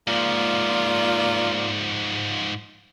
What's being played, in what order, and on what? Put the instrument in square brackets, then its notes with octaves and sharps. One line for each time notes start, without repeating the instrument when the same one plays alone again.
[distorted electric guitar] G#2 F3 [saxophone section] A#3 F4 D5